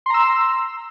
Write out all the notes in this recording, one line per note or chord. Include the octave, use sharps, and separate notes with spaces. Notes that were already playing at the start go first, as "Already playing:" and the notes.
A#5 C6 E6